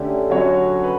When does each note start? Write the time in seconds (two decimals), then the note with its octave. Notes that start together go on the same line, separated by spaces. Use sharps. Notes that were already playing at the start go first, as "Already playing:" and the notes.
Already playing: D3 A3 C#4 G4 D5
0.30 D3 F#3 C#4 F#4 C#5
0.84 B4